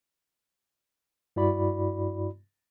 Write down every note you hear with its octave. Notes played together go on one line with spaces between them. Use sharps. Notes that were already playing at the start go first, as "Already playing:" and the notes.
G2 E4 F#4 D5 B5